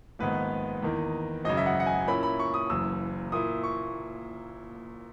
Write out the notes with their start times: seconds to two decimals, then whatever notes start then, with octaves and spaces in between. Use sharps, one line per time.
0.19 A#1 G#2 D#3 G#3 B3 B4
0.83 E2 D#3 A#3
1.45 G#1 F#2 C#3 D#5
1.57 E5
1.66 F#5
1.80 F#5
1.86 G#5
2.07 A#2 A#3 C#4 E4 B5
2.23 B5
2.39 C#6
2.54 D#6
2.70 F#1 F#2 E3 E6
3.32 A#2 A#3 E4 D#6
3.63 C#6